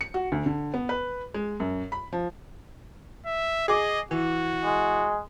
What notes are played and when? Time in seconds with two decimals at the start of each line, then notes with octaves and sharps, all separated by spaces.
0.01 C#7
0.14 F#4
0.32 D2
0.46 D3
0.74 B3
0.89 B4
1.34 G#3
1.60 F#2
1.92 B5
2.13 F3
3.26 E5
3.68 G#4 D#5 D6
4.11 E3 F#4
4.64 G#3